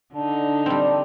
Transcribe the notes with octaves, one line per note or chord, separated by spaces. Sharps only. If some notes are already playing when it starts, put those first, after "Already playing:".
D3 D4 D#4 A5
G3 C4